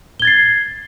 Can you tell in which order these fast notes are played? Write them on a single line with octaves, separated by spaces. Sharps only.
G7 G#6 A6 C7